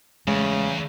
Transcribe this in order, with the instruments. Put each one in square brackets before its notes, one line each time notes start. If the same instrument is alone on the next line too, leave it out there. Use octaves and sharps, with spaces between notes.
[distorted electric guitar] E2 [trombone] C#3 [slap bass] G#3 A3